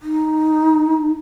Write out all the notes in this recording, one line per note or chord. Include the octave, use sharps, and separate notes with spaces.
D#4